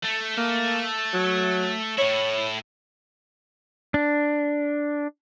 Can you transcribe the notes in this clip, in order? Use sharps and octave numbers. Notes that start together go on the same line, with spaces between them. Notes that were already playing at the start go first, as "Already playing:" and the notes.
A3
A#3
F#3
A2 E4 C#5
D4